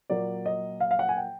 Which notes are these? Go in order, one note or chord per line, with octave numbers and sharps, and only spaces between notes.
A#2 F#3 A#3 D5
D#5
F5
F5
F#5
G#5
G5